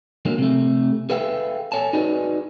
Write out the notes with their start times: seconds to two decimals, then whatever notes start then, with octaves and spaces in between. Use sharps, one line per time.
0.25 D3 F#3 G#3 A#3
0.38 C3 A3
1.10 G#4 A4 B4 E5 F5 G5
1.72 A4 C#5 G#5 A5
1.93 D#4 F#4 G#4 B4 D5 D#5